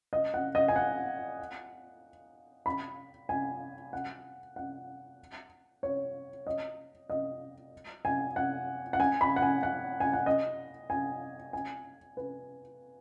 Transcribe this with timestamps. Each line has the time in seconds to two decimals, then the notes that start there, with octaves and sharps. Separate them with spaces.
0.13 D#5
0.34 F#5
0.55 D#5
0.68 G#5
0.76 F#5
2.66 B5
3.29 G#5
3.93 F#5
4.56 F#5
5.83 C#5
6.47 D#5
7.10 D#5
8.05 G#5
8.36 F#5
8.93 F#5
9.00 G#5
9.21 B5
9.36 F#5
9.42 G#5
9.63 F#5
10.00 G#5
10.13 F#5
10.26 D#5
10.90 G#5
11.53 G#5
12.17 B4